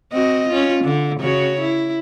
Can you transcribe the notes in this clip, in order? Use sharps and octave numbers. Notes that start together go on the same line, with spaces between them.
C4 F#4 D#5
C#4 F4
D3
C#3 F#4 C#5
E4